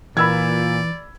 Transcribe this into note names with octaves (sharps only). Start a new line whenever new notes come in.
A#2 E3 D5 B5 E6 G#6